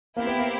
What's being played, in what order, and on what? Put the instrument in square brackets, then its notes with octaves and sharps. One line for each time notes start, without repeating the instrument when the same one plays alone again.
[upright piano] A#3 [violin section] C4 E4 G4
[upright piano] B3
A#3